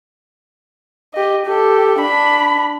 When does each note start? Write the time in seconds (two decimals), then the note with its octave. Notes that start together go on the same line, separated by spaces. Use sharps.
1.14 G4 D#5
1.46 G4 A4
1.99 D4 B5